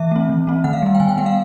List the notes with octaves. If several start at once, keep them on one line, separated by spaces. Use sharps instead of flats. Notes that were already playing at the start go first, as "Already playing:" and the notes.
Already playing: E3 E5
A3 C4
E3
A3 C4
D#3 F#5
F5
G3 B3
G5
D#3 G#5
G5
G3 B3 F#5
F5